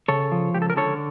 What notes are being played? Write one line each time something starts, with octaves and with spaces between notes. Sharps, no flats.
C#3 A4 C#5
F3
C#2 G4
A4
A#4
D3 A4 C#5